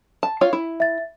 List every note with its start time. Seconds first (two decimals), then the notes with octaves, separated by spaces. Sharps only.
0.23 A5
0.41 F4 C#5 F5
0.53 E4
0.80 E5 A6